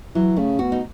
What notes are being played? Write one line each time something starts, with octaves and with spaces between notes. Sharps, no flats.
E3 F#3
C#3 A3
B2 F#4
D#4